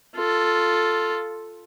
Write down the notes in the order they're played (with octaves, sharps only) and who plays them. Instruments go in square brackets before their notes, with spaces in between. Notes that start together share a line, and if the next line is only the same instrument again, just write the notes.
[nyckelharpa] F4 A4